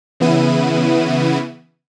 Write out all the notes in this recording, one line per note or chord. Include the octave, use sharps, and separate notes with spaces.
C#3 E3 B3 E4 D#7